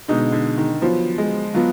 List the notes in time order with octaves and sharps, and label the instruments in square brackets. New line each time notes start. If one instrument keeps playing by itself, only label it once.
[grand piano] B2 G#3 D#4 [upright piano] D3
[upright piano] D3
D#3
[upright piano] F3 [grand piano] F#3 B3 F4
[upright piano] G#3
[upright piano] F#3 [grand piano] B3 F4